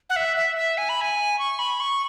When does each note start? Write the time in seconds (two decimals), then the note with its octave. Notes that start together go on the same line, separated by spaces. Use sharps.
0.10 F#5
0.16 E5
0.37 E5
0.56 E5
0.78 G#5
0.89 B5
1.01 G#5
1.39 C#6
1.59 B5
1.80 C#6